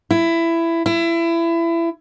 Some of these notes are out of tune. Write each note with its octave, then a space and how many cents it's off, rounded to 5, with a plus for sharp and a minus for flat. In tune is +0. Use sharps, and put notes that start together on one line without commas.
E4 +15
E4 +25